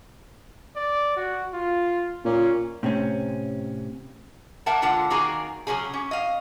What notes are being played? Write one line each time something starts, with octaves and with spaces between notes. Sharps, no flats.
D5
F#4
F4
A#2 C#4
A2 C3 C4 C#4
A#3 A#4 E5 F#5 A5
D3 G#3 F4 F#5 A5
D#3 A#3 F#4 G#4 G#5 A#5
C#3 F#3 C#4 G#4
C#4
D#5 F5